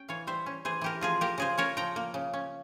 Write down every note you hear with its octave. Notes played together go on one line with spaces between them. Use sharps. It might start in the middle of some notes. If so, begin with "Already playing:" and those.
Already playing: C#4 G5
E3 C#5 F5
G3 C5 E5
C#4
E3 G#4 C5
E3 G4 A#4
F3 F4 G#4
A#3 G4 A#4
C#3 G#4 C5
C#4 A#4 C#5
F3 G5 A#5
A#3
C#3
C#4